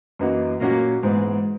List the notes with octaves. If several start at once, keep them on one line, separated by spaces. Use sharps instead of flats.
F#2 E3 A#3 D#4 F#4
A#2 F#3 A#3 C#4 F#4
G#2 E3 G#3 B3